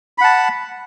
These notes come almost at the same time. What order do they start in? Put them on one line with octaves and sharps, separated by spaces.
B5 F#5 A5